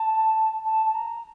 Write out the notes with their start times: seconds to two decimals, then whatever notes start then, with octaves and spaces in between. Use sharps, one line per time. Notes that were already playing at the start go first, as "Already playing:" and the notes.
Already playing: A5
0.64 A5
0.86 A5
0.94 A#5